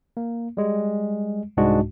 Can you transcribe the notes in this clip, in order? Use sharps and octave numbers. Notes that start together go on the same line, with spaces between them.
A#3
G3 G#3
C2 G#2 G#3 D4 F#4